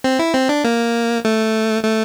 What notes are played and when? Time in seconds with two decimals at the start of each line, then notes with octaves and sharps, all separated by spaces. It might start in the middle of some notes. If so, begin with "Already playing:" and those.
0.04 C4
0.19 E4
0.34 C4
0.49 D4
0.64 A#3
1.25 A3
1.84 A3